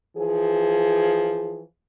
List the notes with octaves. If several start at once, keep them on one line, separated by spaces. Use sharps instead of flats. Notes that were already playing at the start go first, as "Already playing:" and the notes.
E3 F3 G#4